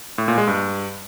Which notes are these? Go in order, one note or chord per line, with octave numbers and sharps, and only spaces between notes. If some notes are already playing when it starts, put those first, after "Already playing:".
A2
A#2
G#3
G2